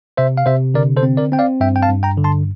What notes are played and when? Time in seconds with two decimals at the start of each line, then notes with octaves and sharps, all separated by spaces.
0.17 C3 C5 E5
0.37 F5
0.46 C3 C5 E5
0.74 D3 A#4 D5
0.97 A4 C5
1.03 C4
1.17 A#4 D5
1.32 C4 G5
1.39 D5 F5
1.60 G2 E5 G5
1.76 G5
1.83 F5 A5
1.89 G2
2.03 G5 A#5
2.18 D3
2.24 A5 C6